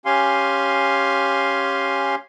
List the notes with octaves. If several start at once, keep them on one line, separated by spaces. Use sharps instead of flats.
C#4 G4 F5 G#5 C6